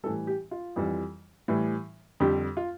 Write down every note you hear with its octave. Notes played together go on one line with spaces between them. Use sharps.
A2 E3 G3 A4
G4
F4
F2 E3 G3
A2 E3 G3
F2 D3 G3 G4
F4